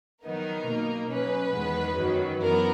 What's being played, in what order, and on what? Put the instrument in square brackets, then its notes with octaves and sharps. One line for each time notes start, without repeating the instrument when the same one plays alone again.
[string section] D#3 F#3 B3 D#4 A#4
B2 A#3 D#4
B2 F#3 C#4 B4
E2 D#3 G#3 B3
F#2 D#3 F#3
F#2 E3 B3 A#4